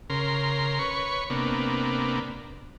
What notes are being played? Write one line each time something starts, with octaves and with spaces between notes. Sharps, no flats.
C#3 A#4 C6
B4 C#5 C#6
C3 A#3 B3 D4